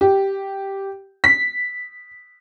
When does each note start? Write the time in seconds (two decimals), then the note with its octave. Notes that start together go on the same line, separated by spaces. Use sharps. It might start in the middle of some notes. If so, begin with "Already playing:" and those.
0.01 G4
1.24 B6